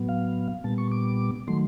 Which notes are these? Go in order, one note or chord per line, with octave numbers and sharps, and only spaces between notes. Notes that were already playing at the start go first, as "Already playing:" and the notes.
Already playing: A2 F#3 B3
F5
A#2 G3 B3 A5
C#6
D6
D#3 F#3 A3 C6